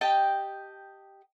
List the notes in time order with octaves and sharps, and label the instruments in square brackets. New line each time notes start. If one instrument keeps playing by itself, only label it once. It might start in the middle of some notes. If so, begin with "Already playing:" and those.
[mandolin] G4 D#5 G5 A5